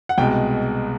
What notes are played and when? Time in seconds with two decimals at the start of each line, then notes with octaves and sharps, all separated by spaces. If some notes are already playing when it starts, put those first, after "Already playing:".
0.09 F#5
0.18 C2 B2 G#3 G5